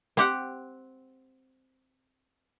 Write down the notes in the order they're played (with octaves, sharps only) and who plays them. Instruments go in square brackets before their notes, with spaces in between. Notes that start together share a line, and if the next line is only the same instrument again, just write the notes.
[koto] C4 G4 F#5